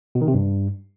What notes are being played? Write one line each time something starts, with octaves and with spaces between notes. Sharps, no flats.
B2
D#3
C3
G2